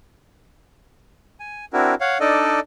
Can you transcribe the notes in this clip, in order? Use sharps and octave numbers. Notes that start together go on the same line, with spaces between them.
G#5
C4 D4 E4 F#4 A#4
C#5 F5 F#5
D4 D#4 A4 D5 D#5